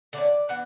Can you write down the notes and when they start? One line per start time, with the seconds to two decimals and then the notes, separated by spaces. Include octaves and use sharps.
0.13 D3 A3 C#4 D5
0.49 E3 B3 D4 F#5